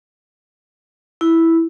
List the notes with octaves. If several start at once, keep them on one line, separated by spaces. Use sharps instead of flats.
E4